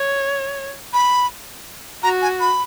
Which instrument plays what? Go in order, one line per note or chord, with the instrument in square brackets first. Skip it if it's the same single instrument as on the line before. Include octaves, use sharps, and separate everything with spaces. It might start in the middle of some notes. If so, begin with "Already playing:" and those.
Already playing: [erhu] C#5
[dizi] B5
[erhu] F#4 [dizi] A#5
[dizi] G#5
B5